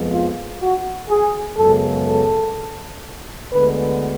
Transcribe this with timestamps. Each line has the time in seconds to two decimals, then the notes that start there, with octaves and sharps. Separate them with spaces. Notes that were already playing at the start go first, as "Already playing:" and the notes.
Already playing: F2 F3 G#3 B3
0.12 F4
0.60 F#4
1.10 G#4
1.57 F#2 C#3 G#3 B3 A4
2.06 A4
3.52 D2 D3 G#3 B3 B4